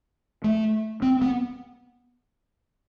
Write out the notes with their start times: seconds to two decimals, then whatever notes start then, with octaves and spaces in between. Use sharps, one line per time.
0.44 A3
1.02 C4
1.21 B3